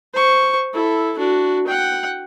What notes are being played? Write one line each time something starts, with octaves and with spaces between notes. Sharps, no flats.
C5 C#6
E4 A4
D4 F#4
F#5 G5